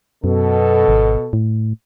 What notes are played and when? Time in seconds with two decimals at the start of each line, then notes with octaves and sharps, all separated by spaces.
0.24 F#2 B2 A4
0.88 G#1
1.33 A2